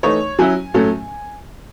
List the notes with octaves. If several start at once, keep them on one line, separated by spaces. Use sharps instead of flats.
E3 A3 D#4 C#5
F#3 C#4 E4 G#5
A2 F#3 A3 C#4